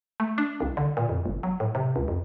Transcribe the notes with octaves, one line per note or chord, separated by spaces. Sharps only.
A3
D4
C2
D3
A#2
F2
G1
F#3
A2
C3
C#2
F2